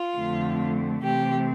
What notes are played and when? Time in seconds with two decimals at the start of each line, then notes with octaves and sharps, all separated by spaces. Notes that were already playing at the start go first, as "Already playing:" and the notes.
Already playing: F4
0.17 F2 D3 A3 C4
1.03 C3 E3 A3 C4 G4